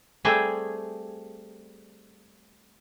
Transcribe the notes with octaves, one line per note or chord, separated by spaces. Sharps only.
G3 A3 C4 G#4